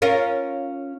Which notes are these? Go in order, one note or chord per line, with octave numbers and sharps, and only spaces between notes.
C#4 F4 A#4